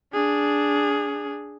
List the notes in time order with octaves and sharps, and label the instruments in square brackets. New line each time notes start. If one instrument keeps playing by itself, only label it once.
[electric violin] D4 G#4